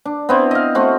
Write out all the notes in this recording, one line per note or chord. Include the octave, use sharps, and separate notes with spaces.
D4
B3 C4 E4
D#5 F5
A3 C4 F#4